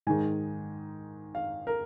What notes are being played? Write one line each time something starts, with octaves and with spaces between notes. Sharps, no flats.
G#2 D#3 G#3 G#5
F5
A#4